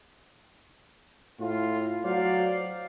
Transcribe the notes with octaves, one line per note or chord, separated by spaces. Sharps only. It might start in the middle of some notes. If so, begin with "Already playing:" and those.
A2 F4
F#3 C5 D5 F5